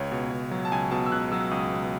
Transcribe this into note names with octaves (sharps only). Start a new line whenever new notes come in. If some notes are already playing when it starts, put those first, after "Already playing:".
Already playing: C#2 C#5
B2
C#2
F#3
A5
C#2 G#5
B2 A5
E6
C#2 F#6
F#3 E6
C#2 D#6
B2